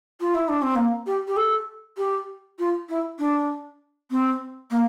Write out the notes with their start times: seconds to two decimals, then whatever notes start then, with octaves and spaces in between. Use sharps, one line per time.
0.20 F4
0.34 E4
0.48 D4
0.62 C4
0.75 A#3
1.06 G4
1.27 G4
1.36 A4
1.97 G4
2.59 F4
2.89 E4
3.19 D4
4.10 C4
4.70 A#3